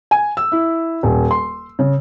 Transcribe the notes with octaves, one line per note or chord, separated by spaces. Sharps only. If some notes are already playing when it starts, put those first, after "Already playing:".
G#5
E6
E4
D#1
C6
C#3